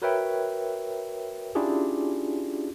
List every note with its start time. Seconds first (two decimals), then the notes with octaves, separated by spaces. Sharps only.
0.02 F#4 A#4 B4 C#5 E5 G5
1.55 C#4 D4 E4 F4 G4 G#4